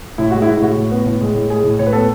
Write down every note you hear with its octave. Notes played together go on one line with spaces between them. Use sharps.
A2 E4
G#3 F#4
E4
G#3
E4
A2 F#4
A2
B3
A2
G#3
A2
G#3 G#4
A2
A2 C#5
B4
B3 A4